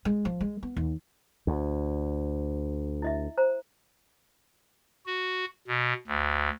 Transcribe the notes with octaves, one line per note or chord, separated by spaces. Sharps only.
G#3
F3
G#3
B3
D#2
D2
E4 D#5 E5
C5 A#5
F#4
B2
D2